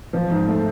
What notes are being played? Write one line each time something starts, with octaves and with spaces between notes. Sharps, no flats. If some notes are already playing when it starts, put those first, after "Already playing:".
F3
G#2
A3